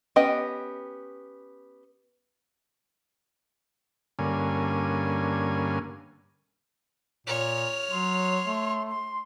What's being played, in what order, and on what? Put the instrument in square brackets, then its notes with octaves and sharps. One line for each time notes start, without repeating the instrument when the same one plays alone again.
[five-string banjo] B3 C#4 G4 D#5 G5
[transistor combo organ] G2 D3 A#3 C#4 G#5
[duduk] A#2 [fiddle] C#5 F6
[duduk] F#3 [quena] C6
[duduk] A3
[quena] C6